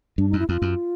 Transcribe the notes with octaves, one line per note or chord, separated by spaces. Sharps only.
G2 D4
F#2 D#4
E4
F2 F4
F#2